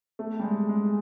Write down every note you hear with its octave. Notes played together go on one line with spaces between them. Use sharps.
A3
G3
G#3
G#3